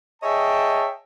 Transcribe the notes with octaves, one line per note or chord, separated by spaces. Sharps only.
G#4 C#5 D#5 E5 G5 A5